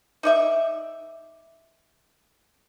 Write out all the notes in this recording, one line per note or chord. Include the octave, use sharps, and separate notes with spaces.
D#4 D5 E5